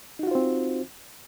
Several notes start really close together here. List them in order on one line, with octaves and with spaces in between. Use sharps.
D#4 F#4 F4 C5 C4